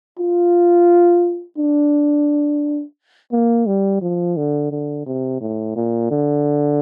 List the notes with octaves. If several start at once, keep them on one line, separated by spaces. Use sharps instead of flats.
F4
D4
A#3
G3
F3
D3
D3
C3
A2
A#2
D3